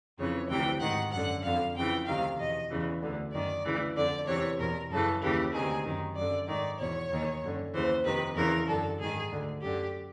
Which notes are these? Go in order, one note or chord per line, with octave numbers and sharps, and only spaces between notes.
F2 C#3 E3 C#5
D2 C3 E3 G5
G#2 D#3 F#5
F#2 D3 F#5
F2 D3 F5
F2 C#3 E3 G5
D2 C3 D#3 F5
E2 B2 D#5
E2 C#3 E3
D2 D3
F#2 D#3 D5
D2 C#3 E3
F2 D3 D5
E2 C3 E3 C#5
E2 B2 A#4
F#2 C#3 E3 A4
D#2 C#3 E3 G4
D2 C3 D#3 G#4
F#2 D#3
F#2 D3 D5
G#2 D#3 D5
E2 B2 C#5
D#2 D#3
F#2 D3
D#2 C#3 E3 C5
F2 C3 D#3 B4
E2 C#3 E3 A#4
F#2 D3 A4
G#2 D#3 G#4
D2 D3
F#2 D3 G4